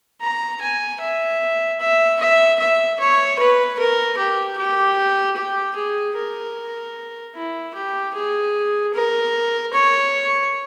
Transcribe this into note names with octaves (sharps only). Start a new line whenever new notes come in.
A#5
G#5
E5
E5
E5
E5
C#5
B4
A#4
G4
G4
G4
G#4
A#4
E4
G4
G#4
A#4
C#5